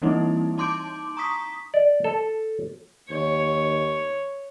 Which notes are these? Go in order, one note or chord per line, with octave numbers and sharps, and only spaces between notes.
E3 G3 A#3 C4 D#4 E4
D#4 A5 C6 D6 G6 D7
A#5 C#6 D#6 B6
D5
A4
D#2 C#5